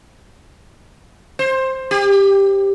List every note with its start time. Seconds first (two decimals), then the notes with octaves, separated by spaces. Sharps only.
1.39 C5
1.91 G4